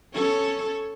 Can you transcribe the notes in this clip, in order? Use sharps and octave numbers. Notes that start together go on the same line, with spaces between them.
C#4 A4 C#5